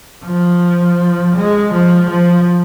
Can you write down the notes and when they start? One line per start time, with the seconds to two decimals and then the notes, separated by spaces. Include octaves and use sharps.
0.25 F3
1.36 G#3
1.73 F3
2.10 F3